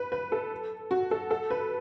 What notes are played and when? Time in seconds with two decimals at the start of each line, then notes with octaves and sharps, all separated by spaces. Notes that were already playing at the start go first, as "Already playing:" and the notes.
Already playing: B4
0.12 B4
0.32 A4
0.91 F#4
1.11 A4
1.31 A4
1.50 B4